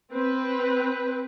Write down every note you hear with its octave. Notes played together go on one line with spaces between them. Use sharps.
C4 B4